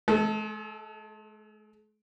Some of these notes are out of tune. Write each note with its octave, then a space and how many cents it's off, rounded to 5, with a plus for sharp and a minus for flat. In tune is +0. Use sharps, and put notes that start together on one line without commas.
G#3 +45 A4 +0